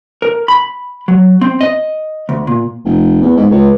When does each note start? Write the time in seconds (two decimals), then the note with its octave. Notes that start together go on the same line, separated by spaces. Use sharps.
0.22 A#4
0.48 B5
1.08 F#3
1.41 C4
1.61 D#5
2.29 D2
2.47 A#2
2.85 F1
3.21 E2
3.37 G#2
3.51 C#2